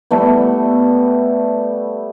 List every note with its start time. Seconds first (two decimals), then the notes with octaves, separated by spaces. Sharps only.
0.11 G3 A3 B3